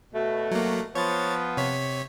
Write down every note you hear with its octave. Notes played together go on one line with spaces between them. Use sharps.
B2 A3
F#3 A#3
F3 B3 C#5 A6
C3 C#5 B6